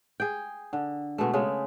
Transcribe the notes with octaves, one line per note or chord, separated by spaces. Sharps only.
G#4 G5
D3
B2 G#3 A3
C#3 G#3 A3